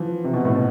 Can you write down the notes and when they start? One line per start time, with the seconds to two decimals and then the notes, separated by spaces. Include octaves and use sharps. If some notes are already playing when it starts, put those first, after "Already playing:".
Already playing: E3 F3
0.24 C3
0.34 B2
0.45 A2
0.56 B2